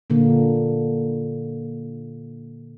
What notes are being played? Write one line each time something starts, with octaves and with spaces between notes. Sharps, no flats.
A#2 D3 A#3